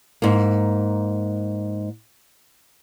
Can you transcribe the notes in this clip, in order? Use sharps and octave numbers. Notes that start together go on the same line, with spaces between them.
G#2 A#3